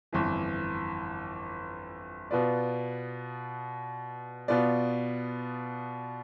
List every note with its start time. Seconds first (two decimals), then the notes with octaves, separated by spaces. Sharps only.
0.13 G1 F2 E3
2.31 B2 B3 F4 B4 D5
4.48 B2 B3 F4 B4 D5